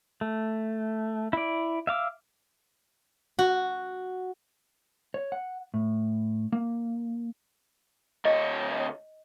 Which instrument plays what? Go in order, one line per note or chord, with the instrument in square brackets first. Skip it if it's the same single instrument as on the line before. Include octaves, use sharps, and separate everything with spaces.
[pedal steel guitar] A3
E4 D5
E5 F5 D6 E6
[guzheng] F#4
[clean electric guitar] C#5
F#5
A2
A#3
[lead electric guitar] D2 C#5 [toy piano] D#5